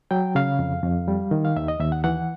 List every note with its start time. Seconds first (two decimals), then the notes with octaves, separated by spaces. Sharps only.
0.11 F#3 G5
0.35 C#3 F5
0.59 F2
0.83 F2
1.08 G3
1.31 D#3
1.45 F5
1.57 D#2 E5
1.68 D#5
1.80 D#2 E5
1.92 F#5
2.04 E3 F#5